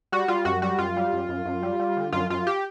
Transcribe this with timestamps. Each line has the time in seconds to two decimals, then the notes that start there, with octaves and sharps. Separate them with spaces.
0.12 G3 F#4
0.28 G3 F4
0.45 F#2 F#4
0.62 G3 F#4
0.79 F#2 F4
0.96 G3
1.13 F#2
1.29 F#2
1.46 F#2
1.63 G3
1.80 G3
1.97 D3
2.13 F#2 F4
2.30 F#2 F4
2.47 G4